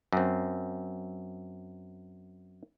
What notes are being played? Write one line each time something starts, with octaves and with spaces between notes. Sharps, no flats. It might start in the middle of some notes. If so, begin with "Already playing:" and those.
F#2 C4